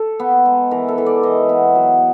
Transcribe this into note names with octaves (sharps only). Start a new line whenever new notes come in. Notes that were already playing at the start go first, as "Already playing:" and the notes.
Already playing: A4
B3
G#3
E3 A#4
A4
E3
D5
E3 D#5
B3
F#3